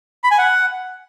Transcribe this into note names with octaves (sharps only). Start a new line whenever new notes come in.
B5
G#5
F#5